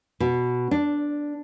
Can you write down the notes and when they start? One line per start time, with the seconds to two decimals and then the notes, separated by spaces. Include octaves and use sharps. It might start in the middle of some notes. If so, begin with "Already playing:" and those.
0.20 B2
0.71 D4